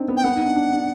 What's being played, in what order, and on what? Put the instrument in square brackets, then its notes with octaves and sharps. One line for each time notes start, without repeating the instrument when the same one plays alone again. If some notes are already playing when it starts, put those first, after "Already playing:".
Already playing: [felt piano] C4 D4 D#4
B3
[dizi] G5
[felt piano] B3 [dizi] F#5
[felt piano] D#4
D4
D4
D4